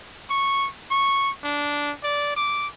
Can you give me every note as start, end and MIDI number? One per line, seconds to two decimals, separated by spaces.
0.30 0.68 85
0.91 1.31 85
1.44 1.92 62
2.03 2.34 74
2.36 2.67 86